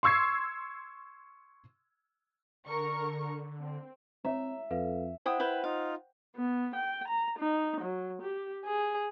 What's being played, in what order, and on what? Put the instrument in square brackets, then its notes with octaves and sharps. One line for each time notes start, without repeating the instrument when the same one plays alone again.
[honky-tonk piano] C6 C#6 E6 G#6 C7
[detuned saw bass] D3 [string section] A#4 C#6
[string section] C4
[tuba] C4 [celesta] C#5 A#5 [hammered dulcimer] E5
[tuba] F2 [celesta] A4 B4 F5
[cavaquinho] E4 G5 D#6 [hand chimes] C5 F#5
[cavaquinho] E4 B4 G5
[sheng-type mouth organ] D#4 F4 [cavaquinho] F5
[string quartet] B3
G5
A#5
D#4
F#3
G4
G#4